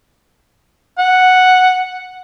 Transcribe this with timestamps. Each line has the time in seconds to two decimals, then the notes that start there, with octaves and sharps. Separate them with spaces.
0.98 F#5